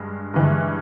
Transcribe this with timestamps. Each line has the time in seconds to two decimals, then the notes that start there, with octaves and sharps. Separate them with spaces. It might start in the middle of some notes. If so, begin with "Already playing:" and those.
Already playing: G2 G#3
0.34 G2 E3 G#3